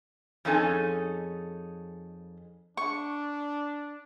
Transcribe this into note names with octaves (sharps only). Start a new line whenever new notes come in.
F2 C#4 D#4 G#4 A4 G#5
D4 C#6